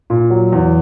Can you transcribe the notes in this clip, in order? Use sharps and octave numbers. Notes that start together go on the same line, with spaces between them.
A#2
F#3
E2